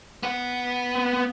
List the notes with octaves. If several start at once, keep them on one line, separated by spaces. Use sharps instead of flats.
B3 F#5